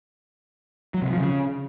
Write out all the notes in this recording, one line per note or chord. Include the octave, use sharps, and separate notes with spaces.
F#3
C3
F3
C#3